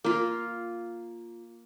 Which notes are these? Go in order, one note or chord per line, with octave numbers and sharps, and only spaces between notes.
A#3 F4